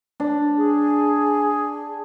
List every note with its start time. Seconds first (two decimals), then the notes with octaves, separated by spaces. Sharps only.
0.20 D4
0.57 G#4